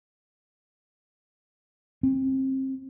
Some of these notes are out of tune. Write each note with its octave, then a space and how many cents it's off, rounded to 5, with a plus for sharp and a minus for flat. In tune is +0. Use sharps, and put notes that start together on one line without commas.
C4 +25